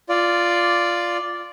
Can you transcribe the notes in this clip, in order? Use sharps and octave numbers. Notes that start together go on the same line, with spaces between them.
F4 D5